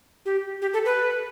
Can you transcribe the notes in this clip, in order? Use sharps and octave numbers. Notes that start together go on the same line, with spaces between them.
G4
G4
A4
B4